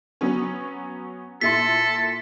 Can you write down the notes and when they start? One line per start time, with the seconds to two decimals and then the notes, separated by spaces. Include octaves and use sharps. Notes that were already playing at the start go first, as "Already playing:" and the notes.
0.21 F#3 B3 C#4
1.41 A#2 E4 A4 C6 B6